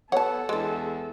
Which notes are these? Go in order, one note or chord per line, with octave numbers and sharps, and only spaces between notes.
B3 A4 C#5 F#5 A5
E2 G#3 D4